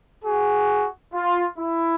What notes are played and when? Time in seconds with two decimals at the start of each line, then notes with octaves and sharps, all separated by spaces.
0.24 F#4 G#4
1.13 F4
1.57 E4